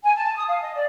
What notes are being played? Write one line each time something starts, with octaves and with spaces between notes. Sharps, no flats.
G#5
A5
D#6
F5
D#5
D5